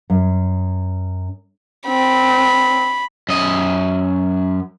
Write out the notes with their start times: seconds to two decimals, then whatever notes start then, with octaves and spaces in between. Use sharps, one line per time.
0.10 F#2
1.88 C4 B5
3.29 F#2 D#5